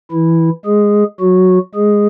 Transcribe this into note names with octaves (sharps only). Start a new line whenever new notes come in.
E3 E4
G#3 G#4
F#3 F#4
G#3 G#4